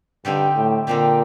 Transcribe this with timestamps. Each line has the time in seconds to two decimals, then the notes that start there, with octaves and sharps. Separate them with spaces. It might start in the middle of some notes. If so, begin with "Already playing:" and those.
0.25 G2 D3 G3 C4 D#4 G4
0.57 A2
0.87 A#2 D3 G3 C4 D#4 G4